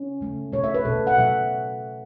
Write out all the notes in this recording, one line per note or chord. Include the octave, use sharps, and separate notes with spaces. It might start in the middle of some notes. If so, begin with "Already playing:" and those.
Already playing: C#4
C#3 A3
B2 A3 C#5
E5
B4
B2 A3 A4
F#5
B2 F#3 A3 E5